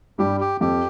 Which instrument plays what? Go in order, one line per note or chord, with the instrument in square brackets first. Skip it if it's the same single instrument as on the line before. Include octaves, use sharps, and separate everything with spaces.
[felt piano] G2 G3 [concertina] G4
[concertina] G4
[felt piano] F2 [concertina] G4